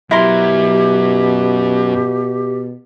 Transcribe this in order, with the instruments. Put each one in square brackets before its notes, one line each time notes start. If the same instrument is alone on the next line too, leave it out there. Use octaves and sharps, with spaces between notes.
[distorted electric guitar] F#2 [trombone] B2 [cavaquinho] E4 A#4 C6 [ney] G4